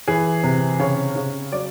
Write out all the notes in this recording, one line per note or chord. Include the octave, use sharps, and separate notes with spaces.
E3 G#4
C3
C#3 C#5
C#3
F#3 D5